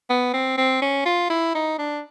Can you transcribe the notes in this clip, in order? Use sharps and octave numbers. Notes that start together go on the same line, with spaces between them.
B3
C4
C4
C#4
F4
E4
D#4
D4